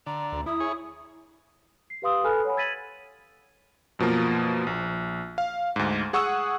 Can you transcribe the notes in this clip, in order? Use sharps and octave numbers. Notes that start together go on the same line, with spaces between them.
D3 A#5
D2
E4 D#6
G#4 C#5
C7
G4 B4 F5 C6 D#6 E6
A4 B4 G#5 B5 F6 F#6
C#5 F#5 G#5 B5
E6 G#6 A6 B6 D#7 F#7
F#2 B2 F3 A#3
A#1
F5
D2 G#2
G#4 F#5 C#6 D#6 E6